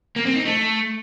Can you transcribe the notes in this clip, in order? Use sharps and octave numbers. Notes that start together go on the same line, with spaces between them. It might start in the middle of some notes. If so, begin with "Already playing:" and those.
A#3
C4
D#4
A3